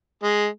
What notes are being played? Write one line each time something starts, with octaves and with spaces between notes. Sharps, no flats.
G#3